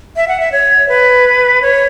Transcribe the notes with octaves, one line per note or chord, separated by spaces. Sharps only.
E5
F#5
E5
C#5
B4
C#5